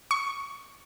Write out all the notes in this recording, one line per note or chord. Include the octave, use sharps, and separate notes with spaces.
C#6